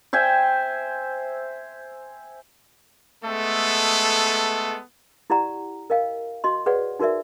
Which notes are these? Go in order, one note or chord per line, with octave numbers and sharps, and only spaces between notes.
C5 E5 G5 G#5
G#3 A3 B3 A4
E4 G4 D5 F#5 A#5
A#4 D#5 F5 G5
F#4 D#5 C6
G#4 B4 C#5 D5 F#5
D#4 F#4 A#4 D5 E5